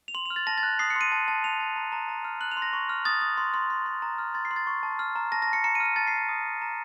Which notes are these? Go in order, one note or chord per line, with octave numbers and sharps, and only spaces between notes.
F7
C6 F#7
F7
F6
A6
A5 A#6
A6
F#6
D#6 C7
C#7
C6 D#7
A5
A5
A5 F7
A5
A#5
A#5
A#5
F6
F#6 F#7
F7
C6
A#6
C#6
F6
D#6 A6
D#6
C6
C6
C6
C6
A#5
F6
C6 A6
C7
C6
A6
C#6
A5
F6
A#5
A5 A#6
A#6
A5
C#7
A#5 C#7
D#7
F6
D#7
A5 A6
C7
A5
C7
D#6
A5
A#5